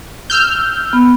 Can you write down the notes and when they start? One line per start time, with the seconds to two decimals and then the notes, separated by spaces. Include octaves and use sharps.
0.30 E6 F6 G6
0.93 B3